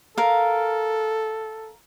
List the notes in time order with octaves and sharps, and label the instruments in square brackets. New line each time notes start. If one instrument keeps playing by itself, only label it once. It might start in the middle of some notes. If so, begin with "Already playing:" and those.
[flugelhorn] A4 [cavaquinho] A#4 F5